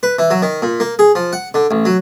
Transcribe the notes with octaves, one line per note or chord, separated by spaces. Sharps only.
B4
E3
F#3
D#3
A#2
A#3
G#4
F3
F#5
D3
A1
F#3